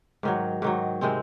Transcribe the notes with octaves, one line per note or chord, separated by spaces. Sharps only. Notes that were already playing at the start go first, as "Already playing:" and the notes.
G#2 D#3 F#3
G#2 D#3 F#3
C3 D#3 G#3 C4